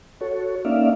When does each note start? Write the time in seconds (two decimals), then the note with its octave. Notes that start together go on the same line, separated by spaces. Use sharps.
0.21 F#4 A4 C#5
0.65 A#3 C#4 D#4 D5 E5 F5